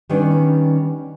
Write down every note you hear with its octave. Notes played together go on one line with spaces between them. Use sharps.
D#3 G3 B3 C#4 D4